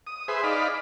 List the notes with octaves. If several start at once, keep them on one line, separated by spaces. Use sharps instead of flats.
D#6
G#4 B4 C5 E5
D#4 D5 F5 B5